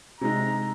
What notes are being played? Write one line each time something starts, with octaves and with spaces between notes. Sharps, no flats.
C3 G#3 D#4 A#5